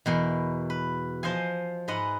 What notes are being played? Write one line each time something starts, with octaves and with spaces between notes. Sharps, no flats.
E2 B2 A#4
B4
F3 C5 D#5 F5 G#5
G#2 G#3 B4 D#5 F#5